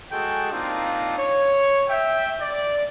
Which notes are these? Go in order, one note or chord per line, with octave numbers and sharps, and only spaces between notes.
G#3 F#4 G#4 A4 G5
A#3 C4 D4 D#4 F4
C#5
E5 G5
D5